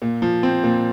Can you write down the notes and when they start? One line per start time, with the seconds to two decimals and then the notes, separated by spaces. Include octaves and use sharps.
0.02 A#2
0.22 F3
0.43 C4
0.63 A#2